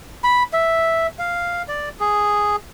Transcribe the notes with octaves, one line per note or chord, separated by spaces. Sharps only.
B5
E5
F5
D5
G#4